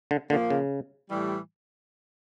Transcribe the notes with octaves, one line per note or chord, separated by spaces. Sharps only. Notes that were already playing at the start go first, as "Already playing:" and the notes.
D3
A#2 D3 F3 A#3
C#3
A2 E3 G3